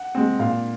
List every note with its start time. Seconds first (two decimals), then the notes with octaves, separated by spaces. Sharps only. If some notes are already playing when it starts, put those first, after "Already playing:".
Already playing: F#5
0.15 G#3 C4
0.39 A#2 F5